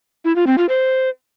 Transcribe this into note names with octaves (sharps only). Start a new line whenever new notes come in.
E4
F4
C4
F4
C5